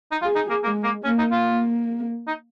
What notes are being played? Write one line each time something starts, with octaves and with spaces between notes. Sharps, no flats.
D#4
F4 G#4
D#4
A#3
G#3 A#3
A#3
A#3 C#4
D#4
F4
A#3
D#4